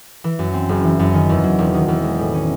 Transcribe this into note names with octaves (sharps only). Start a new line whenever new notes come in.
E3
F#2
C4
F#1
E3
F#2
D#3
E2
F#3
E1
D#3
E2
G#3
A2
C#4